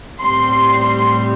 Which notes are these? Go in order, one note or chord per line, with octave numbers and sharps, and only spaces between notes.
A2 G3 C4 C6